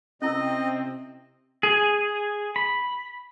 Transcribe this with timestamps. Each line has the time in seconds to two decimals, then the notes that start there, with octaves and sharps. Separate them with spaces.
0.22 C3 C4 C#4 E4 A#4 D#5
1.63 G#4
2.56 B5